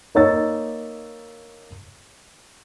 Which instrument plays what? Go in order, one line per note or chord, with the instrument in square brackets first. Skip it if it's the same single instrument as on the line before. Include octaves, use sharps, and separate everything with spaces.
[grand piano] A#3 D#4 C#5 E6 A6